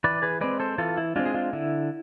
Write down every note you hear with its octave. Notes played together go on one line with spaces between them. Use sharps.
E3 B4 D5
G#4 B4
G#3 C4 B4 D5
A4 C5
E3 F4 A4
E4
G#3 C4 D4 F4
G#4
D4 F4
D3 E4